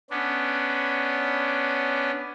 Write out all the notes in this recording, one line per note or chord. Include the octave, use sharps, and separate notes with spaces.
B3 C#4 D4